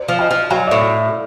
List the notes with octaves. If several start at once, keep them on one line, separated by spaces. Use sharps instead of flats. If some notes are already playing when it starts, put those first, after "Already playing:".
Already playing: C5 D5
F3
D#5 F5
F3
F#3 D#5 F5
A2 D5 E5